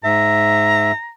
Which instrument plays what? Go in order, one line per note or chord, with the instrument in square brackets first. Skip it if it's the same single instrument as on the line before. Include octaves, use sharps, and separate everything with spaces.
[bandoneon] G#2 E5 [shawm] A#5